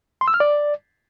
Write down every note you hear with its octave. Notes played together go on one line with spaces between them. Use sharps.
C6
E6
F6
D5